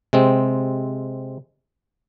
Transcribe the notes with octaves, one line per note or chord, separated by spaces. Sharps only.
C3 G#3 C4